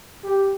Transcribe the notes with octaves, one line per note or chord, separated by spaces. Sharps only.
G4